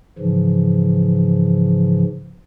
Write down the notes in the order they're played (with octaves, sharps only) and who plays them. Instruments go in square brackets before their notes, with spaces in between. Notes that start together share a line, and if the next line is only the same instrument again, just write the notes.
[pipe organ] G#2 C#3 E3 F3